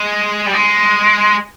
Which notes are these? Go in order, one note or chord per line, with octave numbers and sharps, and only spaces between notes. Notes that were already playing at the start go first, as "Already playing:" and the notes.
Already playing: G#3
G3
G#3